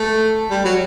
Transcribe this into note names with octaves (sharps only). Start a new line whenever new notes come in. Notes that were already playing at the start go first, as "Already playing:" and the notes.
Already playing: A3
G3
F#3